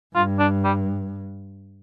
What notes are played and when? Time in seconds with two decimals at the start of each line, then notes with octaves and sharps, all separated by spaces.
0.15 G2 F4
0.39 D4
0.64 G3